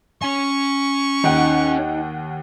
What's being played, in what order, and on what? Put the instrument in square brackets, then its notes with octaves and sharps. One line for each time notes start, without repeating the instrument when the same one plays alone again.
[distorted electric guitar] C#4 G#5 [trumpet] C#6
[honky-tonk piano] D#2 F#5 G5 [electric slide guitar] D#4